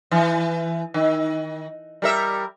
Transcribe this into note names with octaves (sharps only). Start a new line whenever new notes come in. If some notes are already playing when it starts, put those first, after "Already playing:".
E3
D#3
G3 A#4 E5